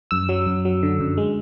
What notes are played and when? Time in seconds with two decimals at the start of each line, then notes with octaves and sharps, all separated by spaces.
0.11 F#2 E6
0.29 F#3
0.47 F#2
0.65 F#3
0.83 D3
1.00 F#2
1.17 G#3